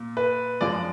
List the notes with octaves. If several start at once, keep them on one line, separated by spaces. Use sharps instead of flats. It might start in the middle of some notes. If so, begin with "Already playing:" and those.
Already playing: A#2
B4
F#2 F3 G#3 D5